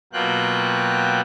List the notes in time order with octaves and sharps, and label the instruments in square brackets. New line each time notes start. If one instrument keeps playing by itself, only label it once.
[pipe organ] B2 F#3 A#3 F4 G5 F#6